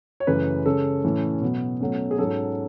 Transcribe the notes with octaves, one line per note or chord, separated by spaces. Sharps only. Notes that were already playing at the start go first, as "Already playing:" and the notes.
C#5
F#2 C#3 E3 A3 C#4 B4
C#3 G#3 C#4 A4
A2 E3 A3 C#4
B2 F#3 B3
B2 F#3 A3 C#4
G#4
G#2 F#3 C#4 A4